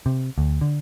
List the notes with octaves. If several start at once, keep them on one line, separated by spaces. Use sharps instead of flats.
C3
D2
D3